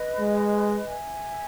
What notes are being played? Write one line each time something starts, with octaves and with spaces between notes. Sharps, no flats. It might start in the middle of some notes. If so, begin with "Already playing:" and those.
Already playing: B4 D#5
G#3
E5 G#5